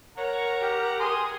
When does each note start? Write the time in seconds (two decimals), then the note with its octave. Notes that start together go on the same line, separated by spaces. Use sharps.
0.17 A#4 C#5 F#5 A#5
0.60 G4
0.99 G#4 C6 D#6